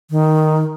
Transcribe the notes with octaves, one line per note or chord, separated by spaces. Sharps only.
D#3